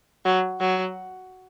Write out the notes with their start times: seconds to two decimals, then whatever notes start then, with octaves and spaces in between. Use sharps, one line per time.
0.25 F#3
0.60 F#3